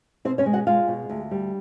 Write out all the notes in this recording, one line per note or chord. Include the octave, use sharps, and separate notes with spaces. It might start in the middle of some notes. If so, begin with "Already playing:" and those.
B2 C4 C5
C#4 C#5
G#3
F#4 F#5
G#3 F4 F5
B2
D2
G3